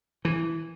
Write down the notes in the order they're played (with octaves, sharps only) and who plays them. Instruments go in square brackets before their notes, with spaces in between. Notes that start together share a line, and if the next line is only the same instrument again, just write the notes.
[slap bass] E3